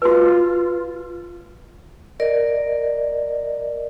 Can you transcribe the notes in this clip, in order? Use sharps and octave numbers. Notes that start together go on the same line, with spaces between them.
F4 F#4 B4
A#4 D5 D#5